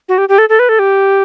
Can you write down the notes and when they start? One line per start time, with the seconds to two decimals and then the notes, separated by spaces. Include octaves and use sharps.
0.09 F#4
0.18 G4
0.29 G4
0.38 A4
0.49 A4
0.59 B4
0.69 A4
0.79 G4